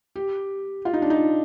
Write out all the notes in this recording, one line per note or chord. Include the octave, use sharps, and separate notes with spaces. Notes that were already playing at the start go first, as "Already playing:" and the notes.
G4
F4
D#4
D4
D#4